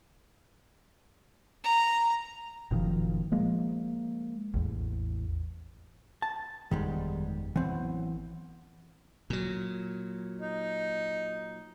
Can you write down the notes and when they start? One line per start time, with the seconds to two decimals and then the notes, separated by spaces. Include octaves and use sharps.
1.64 A#5
2.71 F#1 A#2 D#3 F3
3.32 F3 G#3 A#3
4.54 A1 E2
6.22 A5
6.71 G1 F2 D#3 G3 G#3 B3
7.56 A1 E3 F#3 B3 C4
9.30 A#2 F#3
10.39 D#4